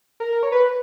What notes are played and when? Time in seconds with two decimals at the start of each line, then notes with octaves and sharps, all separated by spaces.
0.20 A#4
0.43 C#5
0.52 B4